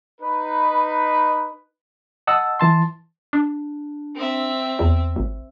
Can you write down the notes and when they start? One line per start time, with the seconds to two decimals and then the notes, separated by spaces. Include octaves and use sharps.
0.21 D#4 B4
2.27 D#5 F#5 A5 E6
2.59 E3 A5 C6
3.33 D4
4.15 C4 E5
4.79 E2
5.16 G#1